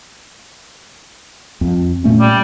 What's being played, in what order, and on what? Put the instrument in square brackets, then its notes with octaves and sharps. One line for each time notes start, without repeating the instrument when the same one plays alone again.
[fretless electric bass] F2
A#2 A3 C#4
[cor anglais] G3